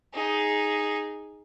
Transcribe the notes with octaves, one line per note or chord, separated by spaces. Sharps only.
D#4 G#4